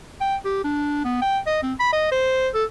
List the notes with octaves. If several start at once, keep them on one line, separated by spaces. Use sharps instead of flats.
G5
G4
D4
B3
G5
D#5
C4
B5
D#5
C5
A4